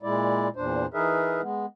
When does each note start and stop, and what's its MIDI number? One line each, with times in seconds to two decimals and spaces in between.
0.03 0.48 46
0.03 0.48 56
0.03 0.48 64
0.03 0.48 74
0.56 0.86 40
0.56 0.86 46
0.56 0.86 62
0.56 0.86 72
0.94 1.41 52
0.94 1.41 63
0.94 1.41 68
0.94 1.41 70
0.94 1.41 71
0.94 1.41 76
1.42 1.66 56
1.42 1.66 59